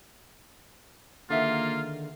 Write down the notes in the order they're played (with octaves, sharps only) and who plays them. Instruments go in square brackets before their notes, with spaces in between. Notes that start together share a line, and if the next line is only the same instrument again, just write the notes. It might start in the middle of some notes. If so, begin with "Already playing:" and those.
[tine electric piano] D3 D#3 [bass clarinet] A#3 [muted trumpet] F4 [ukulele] G#4 E5 F#5